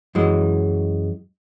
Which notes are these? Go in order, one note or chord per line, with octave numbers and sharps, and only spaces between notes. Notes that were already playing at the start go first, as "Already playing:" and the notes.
F#2 E3 G#3